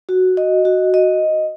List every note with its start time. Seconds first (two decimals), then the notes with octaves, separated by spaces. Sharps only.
0.09 F#4
0.37 D#5
0.65 F#4
0.94 D#5